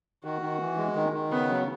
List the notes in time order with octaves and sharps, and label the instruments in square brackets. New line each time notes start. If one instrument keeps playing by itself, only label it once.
[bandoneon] D#3 [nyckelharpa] F#4
[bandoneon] D#3
E3
G#3
D#3
D#3
[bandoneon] C#3 [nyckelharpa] B3
[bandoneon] F#3